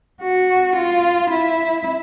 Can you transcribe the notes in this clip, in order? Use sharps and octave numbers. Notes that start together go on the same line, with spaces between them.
F#4
F4
E4